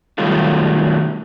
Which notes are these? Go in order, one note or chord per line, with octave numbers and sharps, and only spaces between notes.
B2 D#3 F#3 G3 A3 F4